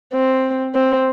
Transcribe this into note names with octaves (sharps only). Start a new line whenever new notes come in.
C4
C4